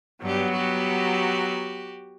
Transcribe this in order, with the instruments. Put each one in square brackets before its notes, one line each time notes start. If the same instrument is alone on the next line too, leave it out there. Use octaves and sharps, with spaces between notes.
[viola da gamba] G2 G4 [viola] F#3 B3
[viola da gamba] F#4 G4